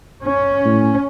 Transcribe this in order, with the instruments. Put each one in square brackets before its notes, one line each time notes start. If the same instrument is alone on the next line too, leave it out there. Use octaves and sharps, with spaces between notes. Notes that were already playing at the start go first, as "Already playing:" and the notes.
[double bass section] C#4
[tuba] A2